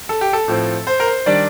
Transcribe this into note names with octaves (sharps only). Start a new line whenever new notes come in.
A4
G4
A4
A2 F3 C4
C5
A#4
C5
D#3 G3 D4 D5